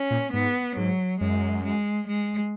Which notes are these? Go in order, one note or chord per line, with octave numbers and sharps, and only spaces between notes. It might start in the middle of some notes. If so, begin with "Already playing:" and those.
Already playing: C#4
A#2
G#2 B3
G#2 F#3
F#2 G#3
G#3
G#3